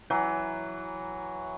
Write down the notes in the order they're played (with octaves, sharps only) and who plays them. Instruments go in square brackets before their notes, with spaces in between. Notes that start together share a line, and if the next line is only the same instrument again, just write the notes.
[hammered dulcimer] E3 F#3